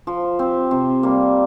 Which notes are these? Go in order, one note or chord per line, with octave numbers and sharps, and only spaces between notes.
F3
C4 G4
C3
G3 A#3